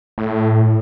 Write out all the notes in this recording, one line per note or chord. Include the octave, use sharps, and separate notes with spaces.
A2